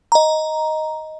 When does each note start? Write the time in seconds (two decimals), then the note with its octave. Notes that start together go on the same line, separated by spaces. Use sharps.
0.12 D#5 A#5